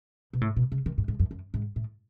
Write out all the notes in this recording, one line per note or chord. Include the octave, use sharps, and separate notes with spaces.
B2
A2
B2
C#3
D#3
G#2
G#2
F#2
F#2
G#2
A2